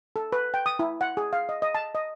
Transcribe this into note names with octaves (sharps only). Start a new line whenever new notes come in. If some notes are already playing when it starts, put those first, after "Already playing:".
A4
B4
G5
D#6
E4
F#5
G#4
F5
D#5
D#5
A5
D#5